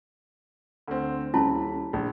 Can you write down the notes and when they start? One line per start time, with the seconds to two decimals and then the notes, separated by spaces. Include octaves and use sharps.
0.88 D2 C4
1.34 D#1 C#4 E4 A5 B5
1.93 A#1